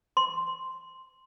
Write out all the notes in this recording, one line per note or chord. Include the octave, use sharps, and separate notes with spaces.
C6